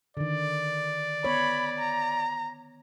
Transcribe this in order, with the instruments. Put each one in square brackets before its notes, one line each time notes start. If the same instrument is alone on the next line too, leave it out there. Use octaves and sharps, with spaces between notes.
[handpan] D3 D#3 [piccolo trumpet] D5
[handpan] B3 C#5 [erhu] B5
[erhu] A#5